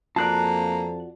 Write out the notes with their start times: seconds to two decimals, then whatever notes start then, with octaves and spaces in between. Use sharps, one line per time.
0.16 F2 A#3 F4 F#4 D5 A5 F#6